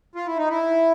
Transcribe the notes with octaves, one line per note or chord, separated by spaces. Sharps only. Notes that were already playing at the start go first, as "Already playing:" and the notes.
F4
E4
D#4
E4